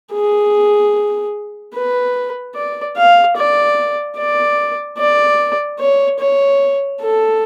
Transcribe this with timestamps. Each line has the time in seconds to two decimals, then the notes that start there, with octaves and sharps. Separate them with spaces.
0.13 G#4
1.75 B4
2.55 D5
2.96 F5
3.37 D5
4.17 D5
4.98 D5
5.80 C#5
6.20 C#5
7.01 A4